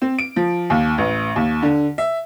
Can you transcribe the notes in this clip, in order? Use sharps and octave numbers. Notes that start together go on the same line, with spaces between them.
C4
D7
F3
D#2
A1
D#2
D3
E5